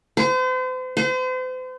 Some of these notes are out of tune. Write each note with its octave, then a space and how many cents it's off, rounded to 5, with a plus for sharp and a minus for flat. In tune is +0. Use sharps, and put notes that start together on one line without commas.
C5 -40
C5 -40